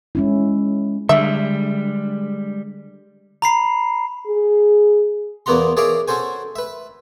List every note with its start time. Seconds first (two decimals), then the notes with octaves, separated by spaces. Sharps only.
0.15 G#3 C#4 E4
1.09 D3 G3 G#3 E5
3.42 A#5 B5 C7
4.27 G#4
5.46 E2 A#3 B3 F#4 A#5 C6
5.77 G#4 A#4 C#5 D5 E5 F5
6.08 C#4 F#4 A4 C5 G#5
6.56 B4 E5